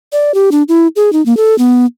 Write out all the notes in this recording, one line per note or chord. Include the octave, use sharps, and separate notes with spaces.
D5
G4
D4
E4
G#4
D#4
A#3
A4
B3